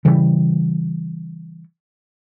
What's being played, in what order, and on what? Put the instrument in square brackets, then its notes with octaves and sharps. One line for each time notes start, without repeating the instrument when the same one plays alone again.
[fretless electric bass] C#3 E3 G3